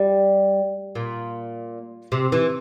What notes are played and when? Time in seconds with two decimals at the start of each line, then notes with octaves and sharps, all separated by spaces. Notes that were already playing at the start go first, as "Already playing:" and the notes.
Already playing: G3
0.95 A#2
2.12 C3
2.32 E3